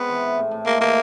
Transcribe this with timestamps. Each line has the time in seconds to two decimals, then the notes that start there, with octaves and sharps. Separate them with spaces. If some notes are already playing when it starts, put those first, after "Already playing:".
Already playing: G#3 B3 C4
0.09 E3
0.23 E3
0.37 A2
0.51 A2
0.66 G#3 A#3
0.81 E3 A#3